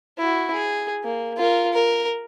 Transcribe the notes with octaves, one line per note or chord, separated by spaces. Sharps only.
E4 F#4
G#4
A#3
F4 A#4
A#4